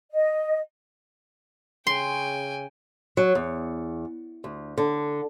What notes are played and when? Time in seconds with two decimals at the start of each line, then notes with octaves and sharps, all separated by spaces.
0.13 D#5
1.87 C#3 G5 G#5 C6
3.17 F#3
3.35 E2
4.44 D2
4.78 D3